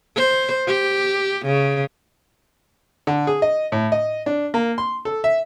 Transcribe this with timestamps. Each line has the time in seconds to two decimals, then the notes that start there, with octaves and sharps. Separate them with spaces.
0.17 C5
0.68 G4
1.46 C#3
3.07 D3
3.27 G#4
3.42 D#5
3.72 A2
3.92 D#5
4.26 D4
4.54 A#3
4.78 C6
5.05 A4
5.24 E5